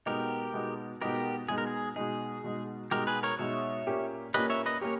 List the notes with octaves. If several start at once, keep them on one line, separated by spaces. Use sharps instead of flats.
B2 G#3 B3 D#4 G4 A#4
B2 G#3 B3 D#4
B2 G#3 B3 D#4 G4 A#4
B2 G#3 B3 D#4 G#4
A#4
G#4
B2 G#3 D#4 G#4
B2 G#3 D#4
B2 G#3 D#4 G4 A#4
G#4 B4
A#4 C#5
B2 G#3 D#4 C#5 E5
A#2 A#3 C#4 G4
A#2 A#3 C#4 G4 B4 D#5
C#5 E5
B4 D#5
A#3 C#4 G4 A#4 C#5